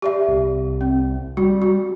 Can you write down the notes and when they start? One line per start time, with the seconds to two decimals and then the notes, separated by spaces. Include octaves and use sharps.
0.02 G4 D5 E5
0.28 C2
0.81 C4
1.37 G3 F#4
1.62 F#4